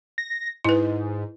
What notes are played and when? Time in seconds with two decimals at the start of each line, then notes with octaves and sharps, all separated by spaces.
0.18 A#6
0.65 G#2 E4 B4